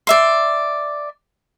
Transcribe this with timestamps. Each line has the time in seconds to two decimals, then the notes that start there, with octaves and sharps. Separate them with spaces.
0.07 D5 E5 C6